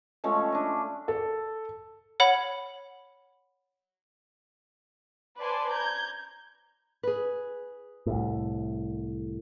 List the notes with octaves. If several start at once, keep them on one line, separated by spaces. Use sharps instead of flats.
F3 G#3 A3 C#4
D4 D#5
A4
C#5 F#5 B5
B4 C5 D5 G#5 A5 C6
A#5 G6 G#6
G#4 B4
C2 A2